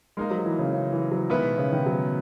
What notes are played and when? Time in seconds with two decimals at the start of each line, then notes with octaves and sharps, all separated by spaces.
0.17 G#3 A#3 D#4 A#4
0.31 F#3
0.45 E3
0.59 C#3
0.73 C#3
0.92 E3
1.11 F#3
1.30 D#3 G#3 A#3 B3 E4 B4
1.43 B2
1.58 C#3
1.72 D#3
1.86 F#3